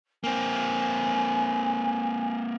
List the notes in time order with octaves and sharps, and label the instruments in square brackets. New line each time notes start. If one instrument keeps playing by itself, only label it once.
[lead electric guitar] A#3 C4 [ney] G#5